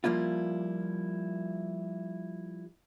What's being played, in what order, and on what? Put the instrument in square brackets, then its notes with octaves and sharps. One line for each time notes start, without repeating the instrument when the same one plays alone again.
[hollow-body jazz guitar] F3 G3 A#3 E4 F4